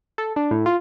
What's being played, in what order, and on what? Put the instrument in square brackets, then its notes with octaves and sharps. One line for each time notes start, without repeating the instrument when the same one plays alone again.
[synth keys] A4
D4
A2
F4